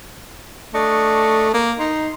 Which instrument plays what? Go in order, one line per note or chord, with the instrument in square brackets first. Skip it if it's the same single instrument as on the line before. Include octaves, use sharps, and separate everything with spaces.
[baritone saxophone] A3 [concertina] D4 D#5 C#6
[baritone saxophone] A#3
[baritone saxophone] D#4 [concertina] C6